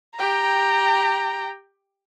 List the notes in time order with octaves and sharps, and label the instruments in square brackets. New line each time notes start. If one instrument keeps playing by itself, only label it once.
[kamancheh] G4 G5 [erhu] A#5